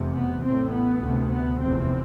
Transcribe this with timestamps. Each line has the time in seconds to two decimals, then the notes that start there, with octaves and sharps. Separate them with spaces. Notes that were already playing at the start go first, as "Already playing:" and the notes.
Already playing: F1 E2 C3
0.15 B3
0.44 A1 A2 C4
0.72 B3
1.01 D2 C3
1.29 B3
1.57 F1 E2 C3 C4